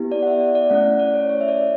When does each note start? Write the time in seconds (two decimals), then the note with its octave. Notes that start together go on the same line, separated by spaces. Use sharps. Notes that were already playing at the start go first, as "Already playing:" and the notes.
Already playing: B3 E4 G4
0.12 D5
0.23 F#5
0.27 E5
0.41 D5
0.55 D5
0.70 A3 C#4 E4 F#5
1.00 D5
1.14 C#5
1.29 C#5
1.41 E5
1.48 D5